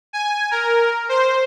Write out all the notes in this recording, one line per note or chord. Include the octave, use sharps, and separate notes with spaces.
G#5
A#4
C5